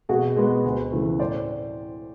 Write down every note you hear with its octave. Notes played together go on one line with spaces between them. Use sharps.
B2 F#4 G#4
G#3 B3
D2
C#3 E3 A3
A2 C5 D5